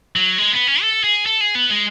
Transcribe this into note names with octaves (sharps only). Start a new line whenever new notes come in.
F#3
G#3
B3
C#4
A4
G#4
A4
G#4
B3
G#3